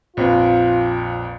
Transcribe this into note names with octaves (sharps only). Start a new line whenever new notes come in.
A#1 F2 F4 B4